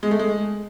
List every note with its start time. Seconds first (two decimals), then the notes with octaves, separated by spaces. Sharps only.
0.03 G#3
0.11 A3
0.19 G#3